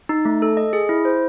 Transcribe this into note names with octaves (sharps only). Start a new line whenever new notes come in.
D#4
A3
A4
D#5
G#4
E4
C5